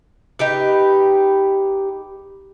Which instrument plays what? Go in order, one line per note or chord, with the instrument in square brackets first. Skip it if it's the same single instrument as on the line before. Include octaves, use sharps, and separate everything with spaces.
[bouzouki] D#4 G4 B4